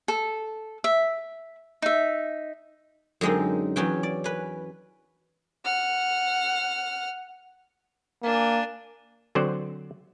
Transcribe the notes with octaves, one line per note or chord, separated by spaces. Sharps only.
A4
E5
D#4 E5
F#2 D3 G#3 C4 D#4
E2 F#3 B3 C#4 G5
D5
C#4 B4
F#5 F6
A#3 D4 G#5
D3 F#3 C4 C5 D5